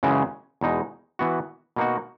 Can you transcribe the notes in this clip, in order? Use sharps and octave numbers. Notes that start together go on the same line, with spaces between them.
F#2 C#3 E3 G#3 C#4
E2 B2 G#3 D#4
E3 B3 F#4
B2 A#3 D#4 F#4